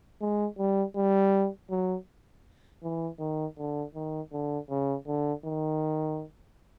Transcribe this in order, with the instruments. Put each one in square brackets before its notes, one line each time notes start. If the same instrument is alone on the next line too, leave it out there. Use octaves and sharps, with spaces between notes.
[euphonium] G#3
G3
G3
F#3
E3
D#3
D3
D#3
D3
C#3
D3
D#3